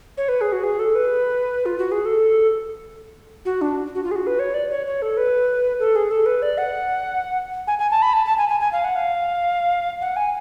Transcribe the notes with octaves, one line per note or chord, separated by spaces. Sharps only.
C#5
B4
G#4
F#4
G#4
A4
B4
F4
F#4
G#4
A4
F#4
D4
F#4
F4
G#4
F#4
B4
C#5
D5
C#5
C#5
A4
B4
A4
G#4
A4
B4
D5
F#5
G#5
G#5
A5
B5
A5
A5
G#5
G#5
G#5
F5
F#5
F5
F#5
G#5